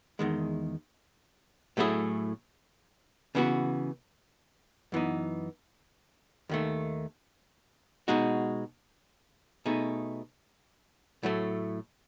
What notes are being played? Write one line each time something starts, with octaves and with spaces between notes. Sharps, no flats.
E2 D#3 G#3
A2 F#3 A3 E4 G#4
C#3 E3 B3 F#4
F#2 E3 B3 D#4
D#2 D#3 A3
B2 G#3 D#4 F#4
B2 A3 D#4 G#4
A2 F#3 A3